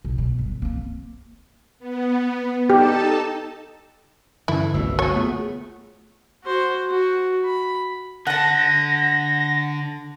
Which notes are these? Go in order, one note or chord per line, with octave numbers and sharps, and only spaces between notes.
B1
B2
G1
A#3 C4
B3
D#4 G4 A4 A5
G2 D3 E3 C#4 E4
G1 C2 F#2 B2 A3 E6
F#4 C#5
A3 B3 F4 G#4
F#4 C5
F#4
B5
D3 F#5 A5 A#6